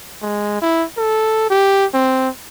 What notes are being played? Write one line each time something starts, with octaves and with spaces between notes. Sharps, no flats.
G#3
E4
A4
G4
C4